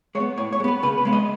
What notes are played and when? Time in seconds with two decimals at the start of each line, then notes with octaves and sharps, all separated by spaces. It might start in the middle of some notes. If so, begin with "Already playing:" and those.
0.15 G#3 C#5
0.20 B3
0.38 A2 C#5
0.53 C#5
0.60 G#3
0.64 B3 B4
0.83 C#3 B4
0.98 B4
1.05 G#3 B3
1.13 D#5